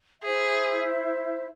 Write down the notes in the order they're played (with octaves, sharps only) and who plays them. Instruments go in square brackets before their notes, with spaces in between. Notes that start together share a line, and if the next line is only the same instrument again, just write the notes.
[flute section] E4 C5 E5 [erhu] G#4